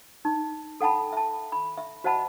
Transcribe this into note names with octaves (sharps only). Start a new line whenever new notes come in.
D#4
A4 F#5 G5 A5 B5
E5 A5
B5
E5
F#4 C5 D#5 F#5 A5 B5